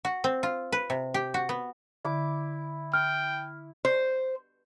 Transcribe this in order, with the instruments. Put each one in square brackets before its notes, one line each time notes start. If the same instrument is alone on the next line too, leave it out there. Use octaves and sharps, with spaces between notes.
[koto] F#4
C4
F4
B4
C3
G4
F#4
B3
[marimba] D3 [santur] E4 D6
[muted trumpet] G5 [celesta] F6
[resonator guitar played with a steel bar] C5